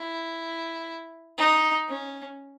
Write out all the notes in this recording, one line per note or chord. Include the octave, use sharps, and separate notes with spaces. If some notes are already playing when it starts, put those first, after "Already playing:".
Already playing: E4
D#4
C#4